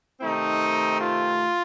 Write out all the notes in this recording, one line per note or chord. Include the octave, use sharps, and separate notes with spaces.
C3 D#3 A3 C4 D#4
F4